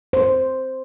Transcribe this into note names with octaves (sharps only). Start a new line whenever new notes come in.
C5